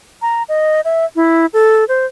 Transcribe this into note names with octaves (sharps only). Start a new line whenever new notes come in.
A#5
D#5
E5
E4
A4
C5